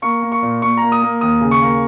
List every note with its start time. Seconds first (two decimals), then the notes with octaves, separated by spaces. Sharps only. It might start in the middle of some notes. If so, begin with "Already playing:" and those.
0.02 A#3 C#6
0.22 A#3
0.32 C#6
0.42 A#2
0.62 A#2 C#6
0.77 A#3 A#5
0.92 D#6
1.02 A#3
1.21 D#2 D#6
1.41 C#3
1.51 C#6
1.62 A#3